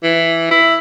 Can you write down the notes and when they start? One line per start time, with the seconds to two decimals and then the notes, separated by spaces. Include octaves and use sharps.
0.04 E3
0.51 E4